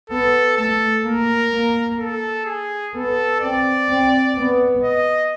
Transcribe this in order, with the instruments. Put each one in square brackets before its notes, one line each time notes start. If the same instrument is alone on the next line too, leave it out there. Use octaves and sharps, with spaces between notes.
[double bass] B3 [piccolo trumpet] A4
[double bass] A3 [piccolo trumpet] A4
[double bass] A#3 [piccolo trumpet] A#4
[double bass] A#3
[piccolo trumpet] A4
G#4
[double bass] B3 [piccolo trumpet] A4
[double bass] C4 [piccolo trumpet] D5
[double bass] C4
B3
[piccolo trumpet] D#5